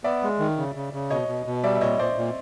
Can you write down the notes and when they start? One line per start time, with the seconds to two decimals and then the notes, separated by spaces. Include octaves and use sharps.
0.04 B3 D5 E5
0.23 G#3
0.39 D#3
0.57 C#3
0.75 C#3
0.93 C#3
1.10 B2 C#5 D#5
1.28 B2
1.46 B2
1.64 G3 D5 E5
1.75 E5
1.81 A#2 C#5 D#5
1.99 A#2 C5 D5
2.16 A#2